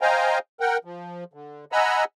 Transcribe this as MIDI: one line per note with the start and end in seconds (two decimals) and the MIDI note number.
0.01 0.39 72
0.01 0.39 75
0.01 0.39 77
0.01 0.39 79
0.01 0.39 80
0.01 0.39 82
0.60 0.77 70
0.60 0.77 78
0.60 0.77 79
0.85 1.24 53
1.33 1.65 50
1.72 2.04 75
1.72 2.04 78
1.72 2.04 80
1.72 2.04 82
1.72 2.04 83
1.72 2.04 88